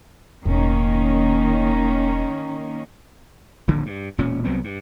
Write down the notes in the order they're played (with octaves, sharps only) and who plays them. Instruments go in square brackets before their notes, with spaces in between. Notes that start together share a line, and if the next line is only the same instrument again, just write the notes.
[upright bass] E1 A2 [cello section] D#3 A#3 C#4
[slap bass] D#1 A#1 A2 D3
G2
E1 A#2 C#4
C2 F#3 B3 C4
G2